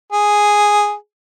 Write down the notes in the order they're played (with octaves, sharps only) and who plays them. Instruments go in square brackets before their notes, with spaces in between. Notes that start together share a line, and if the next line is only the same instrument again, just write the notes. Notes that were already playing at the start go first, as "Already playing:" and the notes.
[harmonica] G#4